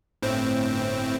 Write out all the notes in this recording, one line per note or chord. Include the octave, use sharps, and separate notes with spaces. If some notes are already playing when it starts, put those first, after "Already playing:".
G1 A2 C4